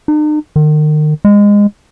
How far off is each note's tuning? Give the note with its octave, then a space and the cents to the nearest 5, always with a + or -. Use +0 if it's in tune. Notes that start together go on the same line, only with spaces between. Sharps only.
D#4 -45
D#3 -35
G#3 -20